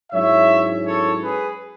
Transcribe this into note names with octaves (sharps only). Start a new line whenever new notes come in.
G#2 F#3 C#4 E4 C#5 E5
A4 C#5
G#4 B4